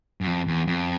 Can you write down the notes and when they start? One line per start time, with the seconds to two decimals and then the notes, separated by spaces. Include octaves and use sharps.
0.21 F#2
0.27 F2
0.48 E2
0.67 F2